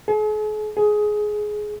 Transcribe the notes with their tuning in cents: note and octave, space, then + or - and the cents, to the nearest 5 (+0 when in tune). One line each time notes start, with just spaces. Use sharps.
G#4 +45
G#4 +15